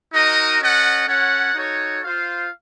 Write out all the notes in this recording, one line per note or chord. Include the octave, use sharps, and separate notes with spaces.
D#4 F#4 A#4 D#5
C#4 A4 D#5 F#5
C#4 A4 C#5 F#5
D#4 F#4 A4 C#5
F4 C5 F5